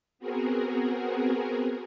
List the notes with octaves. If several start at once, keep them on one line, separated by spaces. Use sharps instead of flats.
B3 C4 F#4 G#4 A#4